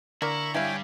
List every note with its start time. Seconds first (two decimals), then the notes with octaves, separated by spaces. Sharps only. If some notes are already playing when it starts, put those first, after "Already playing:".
0.22 D3 A#3 E4 A#4 A#5 C#6
0.54 G2 G3 E4 C#5 E5 F5 G5 G#5